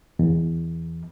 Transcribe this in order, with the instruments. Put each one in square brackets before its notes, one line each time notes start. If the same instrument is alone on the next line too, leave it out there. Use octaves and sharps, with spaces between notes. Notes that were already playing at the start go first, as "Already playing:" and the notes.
[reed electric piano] E2